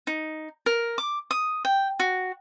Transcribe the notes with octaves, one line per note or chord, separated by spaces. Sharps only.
D#4
A#4
D6
D#6
G5
F#4